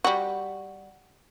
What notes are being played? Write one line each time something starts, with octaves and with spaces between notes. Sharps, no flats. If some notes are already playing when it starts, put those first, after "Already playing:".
G3 F#4